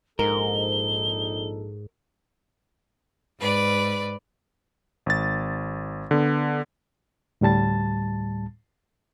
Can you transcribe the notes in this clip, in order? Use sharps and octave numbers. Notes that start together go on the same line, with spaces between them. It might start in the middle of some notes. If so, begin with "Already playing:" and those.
A#1 G#2 D#4 A4 A#4 G7
G#2 B4 D5
G#1 A6
D3 B3
D2 A2 G3 A5 A6